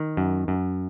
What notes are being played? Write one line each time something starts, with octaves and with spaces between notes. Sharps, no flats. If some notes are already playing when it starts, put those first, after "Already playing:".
Already playing: D#3
F#2
F#2